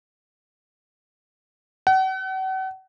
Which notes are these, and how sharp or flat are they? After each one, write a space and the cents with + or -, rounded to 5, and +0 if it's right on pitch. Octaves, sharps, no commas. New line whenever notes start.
F#5 +40